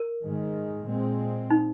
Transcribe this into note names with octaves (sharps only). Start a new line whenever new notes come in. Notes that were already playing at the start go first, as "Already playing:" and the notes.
Already playing: A#4
G#2 D#3 G#3
A#2 G#3 C4
D#4